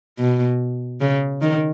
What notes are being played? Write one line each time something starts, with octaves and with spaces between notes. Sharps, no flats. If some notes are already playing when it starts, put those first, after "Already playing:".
B2
C#3
D#3